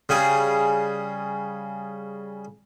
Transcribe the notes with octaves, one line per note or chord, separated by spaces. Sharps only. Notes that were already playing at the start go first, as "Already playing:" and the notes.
C#3 G3 G#4